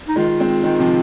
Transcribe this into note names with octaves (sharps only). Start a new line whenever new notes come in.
D#4
D#3 G#3 F4
G#3 C4
D#3 G#3
C3 F3